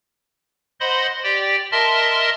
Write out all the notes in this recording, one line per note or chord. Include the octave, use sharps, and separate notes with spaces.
C5 D#5 F#5 B5 C6
G4 D5 G5
A#4 D#5 E5 A5 C6 F6